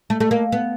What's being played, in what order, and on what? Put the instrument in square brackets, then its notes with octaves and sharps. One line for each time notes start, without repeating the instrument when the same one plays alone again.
[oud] A3
A3
A#3
B3